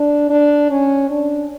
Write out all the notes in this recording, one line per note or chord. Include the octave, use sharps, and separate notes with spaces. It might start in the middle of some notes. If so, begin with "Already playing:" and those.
Already playing: D4
D4
C#4
D4